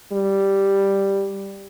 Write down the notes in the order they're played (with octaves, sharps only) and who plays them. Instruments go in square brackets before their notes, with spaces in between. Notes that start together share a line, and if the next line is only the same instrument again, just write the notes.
[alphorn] G3